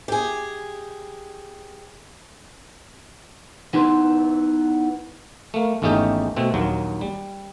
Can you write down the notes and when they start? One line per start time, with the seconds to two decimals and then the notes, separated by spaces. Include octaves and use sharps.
0.08 G4 G#4
3.74 B3 D#4 E4 B4 C6
5.54 A3 A#3
5.82 G#1 E2 A3 C#4 D#4 G4
6.36 B2 A3 C4
6.54 A#1 D#2 F#3
7.01 G3